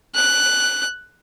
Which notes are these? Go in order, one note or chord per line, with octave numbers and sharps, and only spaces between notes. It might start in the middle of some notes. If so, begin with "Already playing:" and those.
F#6